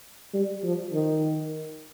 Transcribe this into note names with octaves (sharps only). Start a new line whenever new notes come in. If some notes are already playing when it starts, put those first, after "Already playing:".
G3
F3
D#3